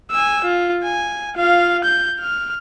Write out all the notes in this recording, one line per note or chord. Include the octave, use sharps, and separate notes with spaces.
G#5 E6
F4
G#5
F4 F5
G6
F6